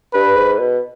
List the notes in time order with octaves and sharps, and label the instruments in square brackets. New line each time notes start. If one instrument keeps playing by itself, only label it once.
[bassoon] G2 [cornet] B4
[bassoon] G#2
B2